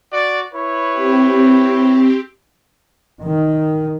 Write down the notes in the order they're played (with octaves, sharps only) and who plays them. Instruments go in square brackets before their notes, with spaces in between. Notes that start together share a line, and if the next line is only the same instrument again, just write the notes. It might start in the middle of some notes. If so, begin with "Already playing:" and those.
[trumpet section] F#4 D5
E4 B4 C#5
[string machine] C4 G4
[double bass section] D#3